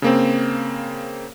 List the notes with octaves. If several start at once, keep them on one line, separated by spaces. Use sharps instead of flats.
C#3 A#3 C4